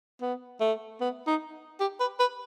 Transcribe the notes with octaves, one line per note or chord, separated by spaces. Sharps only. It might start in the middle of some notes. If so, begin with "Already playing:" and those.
B3
A3
B3
D#4
G4
B4
B4